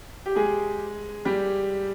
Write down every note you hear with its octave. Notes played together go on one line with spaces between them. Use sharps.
G4
G#3 G#4
G3 G4